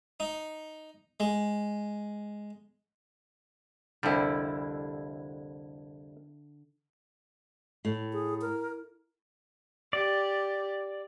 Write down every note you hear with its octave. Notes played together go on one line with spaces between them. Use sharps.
D#4
G#3
C2 F2 D3 G3 E4
A2
G#4
A#4
G4 D5